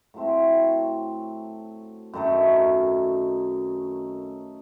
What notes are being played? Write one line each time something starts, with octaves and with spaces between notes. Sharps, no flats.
A2 F#3 A3 C4
F#2 D#3 A3 D#4